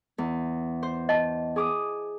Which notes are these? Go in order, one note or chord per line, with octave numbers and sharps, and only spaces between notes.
E2
C5
D#5 A5
G#4 D6 D#6